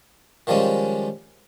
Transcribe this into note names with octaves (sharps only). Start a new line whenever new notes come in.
D#3 F3 G3 G#3 C#4